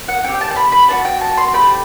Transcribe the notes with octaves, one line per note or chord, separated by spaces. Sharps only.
F#5
C4 G4 G5
G5
A5
A5
B5
B5
B3 D4 F#4 A5
G5
A5
C6
A3 C4 G4 B5